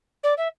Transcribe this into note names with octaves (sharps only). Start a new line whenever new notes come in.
D5
E5